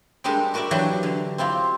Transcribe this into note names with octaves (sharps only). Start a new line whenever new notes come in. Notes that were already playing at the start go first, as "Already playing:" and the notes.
G3 G#3 D4 G4 A4 A#4
F#4 A#4 B4 D5 E5
E3 F#3 D4 F#4 G4 B4
D3
C4 E4 F4 G4